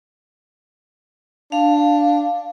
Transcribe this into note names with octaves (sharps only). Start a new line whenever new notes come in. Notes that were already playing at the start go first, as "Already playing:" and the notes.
D4 F5